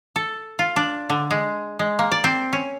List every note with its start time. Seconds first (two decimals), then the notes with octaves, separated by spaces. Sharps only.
0.16 A4
0.59 F4
0.76 D4
1.10 D3
1.31 G#3
1.79 G#3
1.99 A#3
2.12 D5
2.24 C4
2.53 C#4